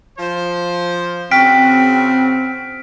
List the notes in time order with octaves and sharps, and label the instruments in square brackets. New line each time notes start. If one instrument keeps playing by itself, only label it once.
[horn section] F3 C5
[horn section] C#3 F#4 [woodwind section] C4 [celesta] G5 [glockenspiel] F6 B6 D7